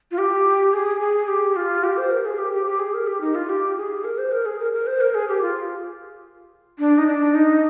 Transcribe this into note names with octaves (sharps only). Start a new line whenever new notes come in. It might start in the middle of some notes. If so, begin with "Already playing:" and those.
F4
G4
G#4
G#4
G4
F4
G4
C5
A#4
G#4
G4
G4
G4
G#4
A#4
G4
D#4
F4
G4
G#4
A#4
C5
A#4
G#4
A#4
A#4
C5
A#4
G#4
G4
F4
D4
D#4
D4
D#4